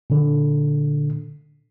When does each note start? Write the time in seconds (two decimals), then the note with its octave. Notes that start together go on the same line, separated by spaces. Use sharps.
0.10 A#2 D3